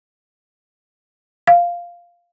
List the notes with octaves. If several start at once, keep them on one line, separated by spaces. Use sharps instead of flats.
F5